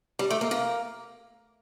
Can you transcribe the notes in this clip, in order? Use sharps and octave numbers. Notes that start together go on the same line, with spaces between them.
G3
A3
A#3
A#3